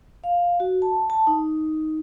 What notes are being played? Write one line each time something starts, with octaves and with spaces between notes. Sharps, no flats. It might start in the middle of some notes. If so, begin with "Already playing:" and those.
F5
F#4
A5
A5
D#4